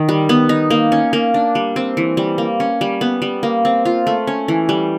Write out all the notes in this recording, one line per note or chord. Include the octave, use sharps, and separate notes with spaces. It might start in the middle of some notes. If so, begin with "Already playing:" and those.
Already playing: D#3
G3
B3
D#4
A#3
C#4
A#3
D4
G3
C4
E3
G3
A#3
C#4
G3
B3
G3
A#3
C4
F4
A3
C#4
E3
G3